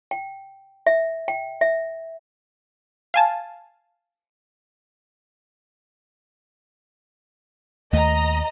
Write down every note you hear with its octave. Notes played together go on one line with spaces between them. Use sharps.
G5
E5
G5
E5
F5 G#5 A5
D#2 A3 D#5 A#5